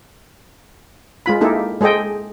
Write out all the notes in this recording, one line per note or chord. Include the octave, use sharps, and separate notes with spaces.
G#3 F4 B5
A#3 D#4 E4 G4 A4
G#3 G#4 A4 D#5 G5